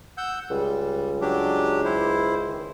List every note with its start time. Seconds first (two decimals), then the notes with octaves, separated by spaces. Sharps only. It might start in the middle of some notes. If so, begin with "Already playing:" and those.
0.17 F#5 E6 G6
0.50 C#2 G3
1.21 F#3 D4 G4
1.85 E4 C5
2.47 D#3